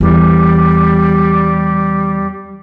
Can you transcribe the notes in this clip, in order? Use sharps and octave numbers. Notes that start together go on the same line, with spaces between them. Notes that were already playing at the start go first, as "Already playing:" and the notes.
E2 G3